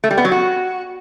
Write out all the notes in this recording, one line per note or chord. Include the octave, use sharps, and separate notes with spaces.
A3
G3
B3
F#3
F#4